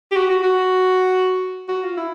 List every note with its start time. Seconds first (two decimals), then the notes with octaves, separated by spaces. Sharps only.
0.11 G4
0.16 F#4
0.30 F#4
0.43 F#4
1.68 F#4
1.83 F4
1.97 E4